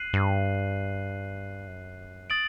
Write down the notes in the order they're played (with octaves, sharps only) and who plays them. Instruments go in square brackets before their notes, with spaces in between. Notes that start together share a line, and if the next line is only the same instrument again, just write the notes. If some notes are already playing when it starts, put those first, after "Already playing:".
Already playing: [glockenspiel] F#6 C7 D#7 F#7
[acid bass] G2
F#2
[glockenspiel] D#6 A6 D7 F#7